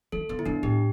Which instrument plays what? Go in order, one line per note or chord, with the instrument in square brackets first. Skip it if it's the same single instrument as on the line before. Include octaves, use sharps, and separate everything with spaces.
[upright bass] E3 [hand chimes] A4
[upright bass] D3 [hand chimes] B3
[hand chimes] E4
[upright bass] C#3 [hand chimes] D4
[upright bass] A2 [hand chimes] G4